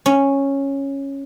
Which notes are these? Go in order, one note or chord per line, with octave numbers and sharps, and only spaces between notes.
C#4